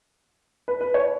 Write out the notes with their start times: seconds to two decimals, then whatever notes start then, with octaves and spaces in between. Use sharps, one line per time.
0.68 B4
0.81 B4
0.94 C#5